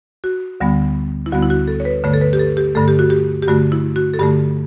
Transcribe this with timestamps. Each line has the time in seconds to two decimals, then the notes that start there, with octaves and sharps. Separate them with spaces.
0.24 F#4
0.60 D2 D3 G3 B3
1.26 E4
1.32 D2 D3 G3 B3 F#4
1.43 E4
1.50 F#4
1.68 A4
1.80 C#5
1.85 B4
2.04 G2 D3 A3 C#5
2.13 A4
2.21 B4
2.33 G4
2.39 A4
2.57 G4
2.75 G2 D3 A3 A4
2.88 G4
2.99 F#4
3.10 G4
3.43 G4
3.48 G2 D3 A3 F#4
3.72 E4
3.96 F#4
4.14 A4
4.19 G2 D3 A3 G4